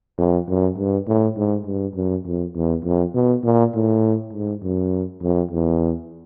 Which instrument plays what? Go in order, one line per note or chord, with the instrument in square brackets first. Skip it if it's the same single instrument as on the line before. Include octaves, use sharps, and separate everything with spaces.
[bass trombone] F2
F#2
G2
A2
G#2
G2
F#2
F2
E2
F2
B2
A#2
A2
G#2
F#2
F2
E2